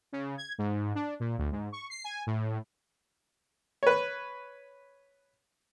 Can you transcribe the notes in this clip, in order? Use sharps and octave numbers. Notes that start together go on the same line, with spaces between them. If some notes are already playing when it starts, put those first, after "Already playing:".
C#3
G#6
G#2
D4
A#2
D2
G#2
C#6
C7
G#5
A2
B4 C#5